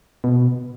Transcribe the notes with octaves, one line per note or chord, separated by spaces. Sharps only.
B2